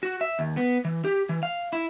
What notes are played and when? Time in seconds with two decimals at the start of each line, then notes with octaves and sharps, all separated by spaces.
0.03 F#4
0.21 E5
0.39 D#2
0.57 B3
0.85 E3
1.05 G4
1.29 E3
1.43 F5
1.73 E4